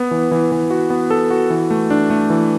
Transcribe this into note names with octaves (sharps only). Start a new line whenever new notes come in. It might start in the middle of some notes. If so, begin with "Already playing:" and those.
Already playing: B3
E3
E3
E3
F#4
B3
A4
F#4
E3
A3
D4
A3
E3